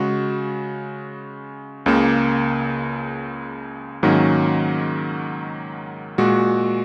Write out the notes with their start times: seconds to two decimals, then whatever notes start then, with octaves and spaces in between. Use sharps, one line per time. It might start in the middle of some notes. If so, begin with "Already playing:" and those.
Already playing: C#3 G#3 F#4
1.86 C#2 C#3 A#3
4.03 G#2 D#3 F#3 A#3 C#4
6.18 A#2 G#3 F#4